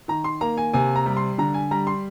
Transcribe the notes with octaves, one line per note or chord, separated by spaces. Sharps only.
D#3 A#5
C6
A#3 A#5
G#5
C3 G#5
A#5
G3
C6
D3 A#5
G#5
G3 A#5
C6